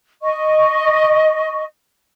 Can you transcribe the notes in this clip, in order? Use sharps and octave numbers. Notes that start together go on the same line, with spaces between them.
D#5 C#6